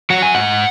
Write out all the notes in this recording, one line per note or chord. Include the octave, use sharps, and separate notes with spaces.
F#3 F#5
G#5
G#2 F#5